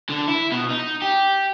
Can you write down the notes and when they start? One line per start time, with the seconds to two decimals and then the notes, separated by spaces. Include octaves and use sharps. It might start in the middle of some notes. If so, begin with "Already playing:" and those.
0.09 D3
0.28 E4
0.52 B2
0.71 D#4
1.02 G4